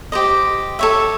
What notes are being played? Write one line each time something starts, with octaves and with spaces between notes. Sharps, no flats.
G4 C5 D#5
A4 C#5 E5